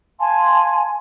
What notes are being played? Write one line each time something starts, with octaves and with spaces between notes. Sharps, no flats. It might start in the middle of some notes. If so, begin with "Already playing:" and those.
F5 G#5 A5 C6